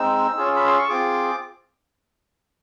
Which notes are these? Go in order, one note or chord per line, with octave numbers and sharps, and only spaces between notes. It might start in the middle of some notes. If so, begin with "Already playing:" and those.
Already playing: G#3 C4 D#4 E6
C#4 F4 G#4
B5
C6
C#6
C4 F4 G#4 D6